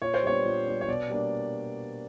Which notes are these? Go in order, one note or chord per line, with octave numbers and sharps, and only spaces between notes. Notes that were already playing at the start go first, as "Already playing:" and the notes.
A#2 C#5
C5
G3 B3 D4 C#5
A#2
G3 B3 D4
C#5
B2 D5
G3 A#3 D4